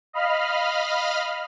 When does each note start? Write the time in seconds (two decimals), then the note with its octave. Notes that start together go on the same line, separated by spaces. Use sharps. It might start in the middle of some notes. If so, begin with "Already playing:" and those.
0.13 D#5 F5 B5 F6